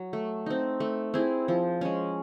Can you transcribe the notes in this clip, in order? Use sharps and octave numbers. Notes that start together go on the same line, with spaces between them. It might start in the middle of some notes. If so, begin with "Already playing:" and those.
Already playing: F#3
A3
C4 D#4
A3
C4 E4 G#4
F3
G#3 C#4